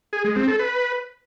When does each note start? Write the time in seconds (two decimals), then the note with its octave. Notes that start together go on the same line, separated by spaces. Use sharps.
0.13 G#4
0.24 G#3
0.36 C4
0.48 A4
0.59 B4